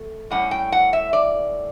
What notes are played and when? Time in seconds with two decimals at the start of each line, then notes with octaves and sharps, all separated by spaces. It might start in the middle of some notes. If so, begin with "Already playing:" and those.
Already playing: A3
0.31 A2 G3 C#4 F#5
0.51 G5
0.72 F#5
0.93 E5
1.13 D5